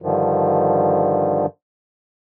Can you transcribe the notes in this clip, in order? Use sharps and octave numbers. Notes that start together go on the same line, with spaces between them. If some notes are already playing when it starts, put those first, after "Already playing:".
G2 D3 D#3 F3